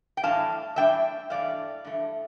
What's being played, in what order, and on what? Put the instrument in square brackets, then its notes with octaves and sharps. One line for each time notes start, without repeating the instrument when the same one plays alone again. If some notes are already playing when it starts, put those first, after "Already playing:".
[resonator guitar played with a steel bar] G5
A2 E3 G3 D4 F5 A5
A2 E3 G3 D4 E5 G5
G2 E3 A3 D5 F5
G2 E3 A3